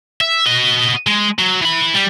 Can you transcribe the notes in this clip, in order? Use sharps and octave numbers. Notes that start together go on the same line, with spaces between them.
E5
F#4 D#5
G#3
F#3
E3 B5
G3